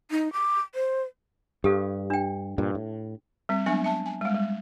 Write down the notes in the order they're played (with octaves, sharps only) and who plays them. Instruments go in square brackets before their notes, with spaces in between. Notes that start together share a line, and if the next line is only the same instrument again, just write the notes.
[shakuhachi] D#4
D6
C5
[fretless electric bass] G2 [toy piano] G4 A4 F5
[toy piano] D4 G5
[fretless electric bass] G2 A#2
A2
[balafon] G3 C4
F#3 G#3 B3 D4 G#5
E5 A5
G#5
G3 G#3
G3